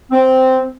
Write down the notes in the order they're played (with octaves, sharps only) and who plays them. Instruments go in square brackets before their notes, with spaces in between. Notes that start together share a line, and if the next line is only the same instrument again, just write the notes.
[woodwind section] C4